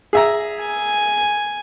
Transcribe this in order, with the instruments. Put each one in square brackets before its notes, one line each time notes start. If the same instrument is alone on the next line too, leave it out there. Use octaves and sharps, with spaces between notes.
[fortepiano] G#4 E5 A#5
[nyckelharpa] G#5